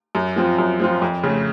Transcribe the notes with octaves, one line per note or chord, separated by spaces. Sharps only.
F#2
F3 C4 F4
F#2
F3 C4 F4
F2
C#3 A3